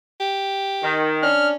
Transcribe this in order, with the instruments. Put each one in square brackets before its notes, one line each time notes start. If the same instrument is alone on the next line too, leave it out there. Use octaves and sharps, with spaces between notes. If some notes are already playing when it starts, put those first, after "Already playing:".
[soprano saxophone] G4
[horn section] D#3
[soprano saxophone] C#4 [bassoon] D4 [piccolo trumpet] F6